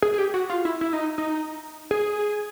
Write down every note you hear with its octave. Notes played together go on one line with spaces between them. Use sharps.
G#4
G#4
G4
F#4
F4
E4
E4
D#4
D#4
G#4